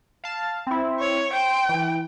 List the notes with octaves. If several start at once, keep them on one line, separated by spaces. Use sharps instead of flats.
F5 A5
C4 E4
C#5
C5 G5
E3